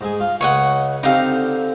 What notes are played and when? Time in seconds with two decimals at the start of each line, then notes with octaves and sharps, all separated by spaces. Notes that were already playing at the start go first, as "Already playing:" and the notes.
0.01 G#2 G#4
0.20 F4
0.41 C#2 C#5 D#5 F#5
1.03 D3 C4 D#4 G4 F5